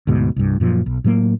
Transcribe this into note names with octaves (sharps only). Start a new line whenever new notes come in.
D2 G#2 B2
C2 G2
F#2 A#2 F3
B1
A2 F#3 G3 A#3